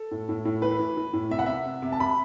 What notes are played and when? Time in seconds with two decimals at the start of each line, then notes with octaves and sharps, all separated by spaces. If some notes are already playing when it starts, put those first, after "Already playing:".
Already playing: A4
0.11 A2
0.29 A2
0.45 A2
0.62 E3 B4
0.79 E3
0.97 E3
1.13 A2
1.31 C3 E5
1.39 F#5
1.46 C3 E5
1.65 C3
1.82 C3
1.92 A5
1.99 C3 B5